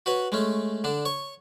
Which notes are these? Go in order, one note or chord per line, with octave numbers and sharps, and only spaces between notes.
F#4 B4 C#5
G#3 A3 C#4
D3 D4
C#5 C#6